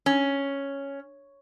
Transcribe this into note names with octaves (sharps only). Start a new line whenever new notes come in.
C#4